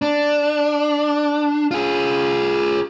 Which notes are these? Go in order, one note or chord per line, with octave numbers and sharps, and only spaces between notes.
D4
F4 G#4